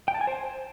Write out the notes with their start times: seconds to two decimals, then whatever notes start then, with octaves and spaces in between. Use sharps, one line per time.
0.08 G5
0.14 A5
0.21 G#5
0.27 C5